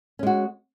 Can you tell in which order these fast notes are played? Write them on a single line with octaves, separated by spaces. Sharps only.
C#4 G#3 F#4